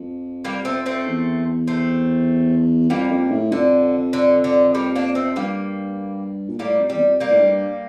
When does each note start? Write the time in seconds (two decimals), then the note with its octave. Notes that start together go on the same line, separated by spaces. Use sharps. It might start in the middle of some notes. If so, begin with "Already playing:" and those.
Already playing: F2
0.45 G3 A#3
0.65 A3 C4
0.86 A3 C4
1.07 E2
1.67 A3 C4
2.90 F2 G3 A#3
3.10 F2
3.31 A2
3.52 F2 D3
4.13 D3
4.44 D3
4.75 G3 A#3
4.95 A#3 D4
5.15 A3 C4
5.36 G2 G3 A#3
6.49 A#2
6.59 A2 G3 A#3
6.80 F2
6.90 E2 G3
7.00 F2
7.20 G3 A#3
7.30 A2
7.41 G2